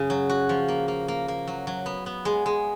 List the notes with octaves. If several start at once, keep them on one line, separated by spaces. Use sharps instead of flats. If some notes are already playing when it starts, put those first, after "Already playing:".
Already playing: F#2 C#3
F#3
F#4
F3
A#3
A#3
A#3
A#3
F#3
F#3
B3
B3
G#3
G#3